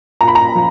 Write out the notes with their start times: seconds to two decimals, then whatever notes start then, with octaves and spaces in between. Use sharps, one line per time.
0.21 A#2 A#5
0.28 B5
0.35 A#5
0.55 F3